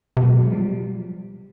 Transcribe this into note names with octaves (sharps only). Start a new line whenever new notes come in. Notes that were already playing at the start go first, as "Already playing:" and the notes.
C3
B2 F#3 G#3
F3 G3